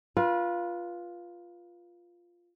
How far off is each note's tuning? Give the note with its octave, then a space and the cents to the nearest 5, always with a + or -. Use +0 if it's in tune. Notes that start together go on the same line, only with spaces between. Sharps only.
F4 +0 B4 -30